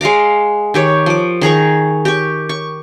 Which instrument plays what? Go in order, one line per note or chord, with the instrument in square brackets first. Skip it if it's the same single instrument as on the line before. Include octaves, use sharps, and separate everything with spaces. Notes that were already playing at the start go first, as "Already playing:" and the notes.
[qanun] G#3 F5 A#5 D6
D#3 G4 C#5
F3 D6
D#3 G#4 A#5 C#6
G4 C#6
C#6